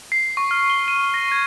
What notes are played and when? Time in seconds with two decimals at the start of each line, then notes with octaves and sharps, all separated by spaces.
0.12 C7
0.37 C#6
0.51 F6
0.70 G7
0.88 D#7
1.14 A#6
1.32 G#6